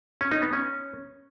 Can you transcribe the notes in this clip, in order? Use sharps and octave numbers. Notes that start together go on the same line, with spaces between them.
C#4
D#4
B3
C#4